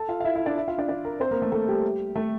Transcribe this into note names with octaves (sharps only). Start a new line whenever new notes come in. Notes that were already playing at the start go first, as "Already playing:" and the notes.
Already playing: A4 A5
F4 F5
F5
E4 E5
E4 E5
D4 D5
E4 E5
F4 F5
D4 D5
D4 D5
A#4 A#5
C4 C5
A#3 A#4
A3 A4
A3 A4
G3 G4
A3 A4